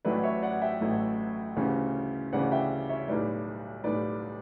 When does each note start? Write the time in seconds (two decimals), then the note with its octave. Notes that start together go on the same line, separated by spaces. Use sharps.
0.05 A1 A2 F#3 A3 B4 D5
0.23 C#5 E5
0.42 D5 F#5
0.61 E5 G5
0.81 A1 A2 F#3 A3
1.56 D2 C#3 E3 G3 C#4
2.33 D2 C#3 E3 G3 C#4 D5 F#5
2.52 E5 G5
2.89 C#5 E5
3.08 B1 A2 G3 B4 D5
3.84 B1 A2 G3 B4 D5